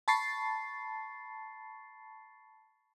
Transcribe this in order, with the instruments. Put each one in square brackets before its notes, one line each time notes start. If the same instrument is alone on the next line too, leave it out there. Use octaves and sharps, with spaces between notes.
[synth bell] A5 B5 C#6 A6 C7